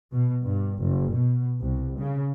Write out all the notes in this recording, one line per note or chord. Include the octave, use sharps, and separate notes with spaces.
B2
G2
F#1
B2
C2
C#3